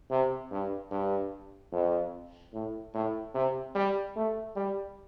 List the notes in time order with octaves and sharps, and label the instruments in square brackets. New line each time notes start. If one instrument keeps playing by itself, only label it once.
[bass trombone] C3
G2
G2
F2
A2
A2
C3
G3
A3
G3